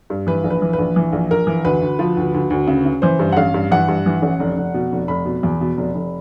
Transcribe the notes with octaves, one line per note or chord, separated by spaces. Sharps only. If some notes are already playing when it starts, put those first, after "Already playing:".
G2
E3 B4
A#1
B4
E3
B4
A#1
E3
A#1
A#1 A#4
E3
D2 B4
D2
F3
D2
D2
D2
C#3
C#3
E3 C5
G2
F#5
A1 F5
G2
E3 F#5
G2
E3
A1
F1
F1
B2
F1
F1 B5
B2
E2
B2
F1
F1